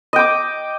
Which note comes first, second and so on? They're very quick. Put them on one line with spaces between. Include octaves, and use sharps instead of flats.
D#5 G5 D6